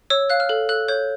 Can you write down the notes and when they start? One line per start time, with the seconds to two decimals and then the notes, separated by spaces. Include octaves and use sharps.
0.10 C#5 E6
0.30 F5 F#6
0.40 F6
0.49 A4
0.69 A4 F#6
0.88 C#5 G6